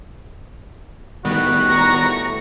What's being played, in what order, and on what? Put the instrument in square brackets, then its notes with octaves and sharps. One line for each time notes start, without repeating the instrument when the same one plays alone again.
[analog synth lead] A2 [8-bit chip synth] D#3 G3 B3 [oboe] F#4
[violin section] A#5 C#6 A#6